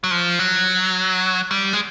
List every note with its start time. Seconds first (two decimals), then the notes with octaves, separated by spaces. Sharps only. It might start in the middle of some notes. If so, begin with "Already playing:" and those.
0.04 F#3
0.11 F3
0.39 F#3
1.51 G3
1.73 G#3